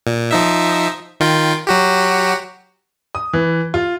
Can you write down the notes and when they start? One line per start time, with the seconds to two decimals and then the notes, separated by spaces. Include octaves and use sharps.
0.07 A#2
0.31 F3 D#4 E5
1.20 D#3 F4 G5
1.67 F#3 F#4 G4
3.15 D#6
3.33 E3
3.74 F4